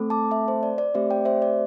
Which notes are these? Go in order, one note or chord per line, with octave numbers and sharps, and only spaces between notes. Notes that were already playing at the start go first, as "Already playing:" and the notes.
Already playing: A3 C4 A4
A5 D6
E5 A5
C5
D5
D5
A3 C4 G4 C5 E5
D5 G5
C5 E5
D5